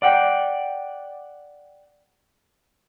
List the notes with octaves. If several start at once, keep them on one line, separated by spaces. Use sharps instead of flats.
D5 F#5 G5